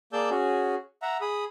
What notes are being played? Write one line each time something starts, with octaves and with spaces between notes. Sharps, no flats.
A#3 G#4 D5 A5 E6 G6
C#4 F#4 G#4
E5 F#5 A#5
G#4 B5 D#6